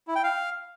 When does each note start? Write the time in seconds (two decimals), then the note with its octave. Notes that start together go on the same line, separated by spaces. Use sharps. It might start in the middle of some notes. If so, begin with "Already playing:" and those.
0.08 E4
0.16 G5
0.24 F5